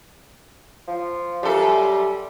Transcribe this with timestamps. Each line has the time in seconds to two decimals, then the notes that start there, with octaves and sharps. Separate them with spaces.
0.88 F3
1.43 F#2 G3 A4